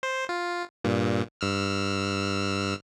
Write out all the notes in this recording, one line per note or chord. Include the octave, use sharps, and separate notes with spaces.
C5
F4
G2 A#2
G2 E6 F6